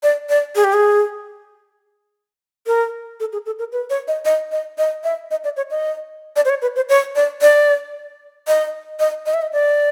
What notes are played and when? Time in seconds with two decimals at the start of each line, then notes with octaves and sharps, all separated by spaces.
0.03 D5
0.29 D5
0.55 G#4
0.64 G4
0.73 G#4
2.67 A#4
3.20 A4
3.32 G#4
3.46 A4
3.59 A#4
3.72 B4
3.90 C#5
4.08 D#5
4.25 D#5
4.52 D#5
4.78 D#5
5.04 E5
5.31 D#5
5.44 D5
5.57 C#5
5.70 D#5
6.36 D5
6.45 C5
6.49 C#5
6.62 B4
6.76 C5
6.89 C#5
7.15 D5
7.41 D5
8.47 D#5
9.00 D#5
9.26 D#5
9.34 E5
9.42 D#5
9.53 D5